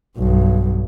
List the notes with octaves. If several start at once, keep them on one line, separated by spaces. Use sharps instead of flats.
B1 G2